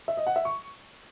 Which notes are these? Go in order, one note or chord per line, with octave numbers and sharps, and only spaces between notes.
E5
D#5
F#5
E5
C#6